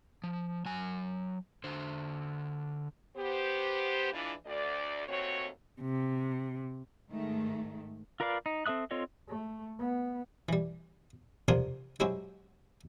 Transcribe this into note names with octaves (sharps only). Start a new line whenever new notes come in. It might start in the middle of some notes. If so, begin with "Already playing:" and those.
F3
F#3 G#5
D3 C5
B3 G4 C5
E3 G#3 D4 E4 F4 D5
D2 D5
D#2 A3 C4 F#4 C#5
C3
G#2 D#3 A3
F4 A#4 B4 D5 F5
D#4
C4 A4 E5 D#6 F#6
C4 F4 A4 C#5 D#5
A3
B3
E3 G3
C3 F3 D4 A#4 G#5 C6
F#3 G#3 C4 E4 F#4 G4